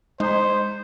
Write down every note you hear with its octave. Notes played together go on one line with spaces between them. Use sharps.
G#3 D#4 C5